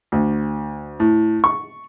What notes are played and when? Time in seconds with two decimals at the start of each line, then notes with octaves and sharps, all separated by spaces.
0.12 D2
1.00 A2
1.44 C#6